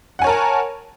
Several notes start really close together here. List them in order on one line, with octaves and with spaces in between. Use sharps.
F#5 G#5 C#5 A#4 A5